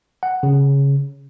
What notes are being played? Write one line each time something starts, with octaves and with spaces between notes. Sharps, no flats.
F#5
C#3